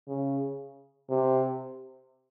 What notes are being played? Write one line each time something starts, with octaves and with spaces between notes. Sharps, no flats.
C#3
C3